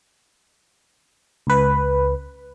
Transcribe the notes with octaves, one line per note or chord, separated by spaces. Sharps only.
C#2 B4